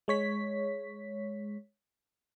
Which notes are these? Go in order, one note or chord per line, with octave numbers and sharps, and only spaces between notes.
G#3 C#5 B6